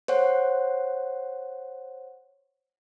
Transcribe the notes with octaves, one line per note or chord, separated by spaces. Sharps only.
C5 C#5 F#5